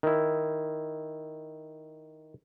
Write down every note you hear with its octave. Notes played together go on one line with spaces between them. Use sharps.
D#3 E4